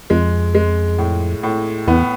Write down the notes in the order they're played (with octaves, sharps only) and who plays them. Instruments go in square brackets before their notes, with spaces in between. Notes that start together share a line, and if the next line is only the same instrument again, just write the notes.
[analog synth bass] F2 [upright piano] G#3
[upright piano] G#3
A2
A2
[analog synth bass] E2 [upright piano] B3